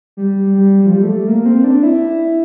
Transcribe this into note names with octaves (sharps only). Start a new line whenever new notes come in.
G3
G3
G3
F3
G3
A3
A#3
C4
D4
E4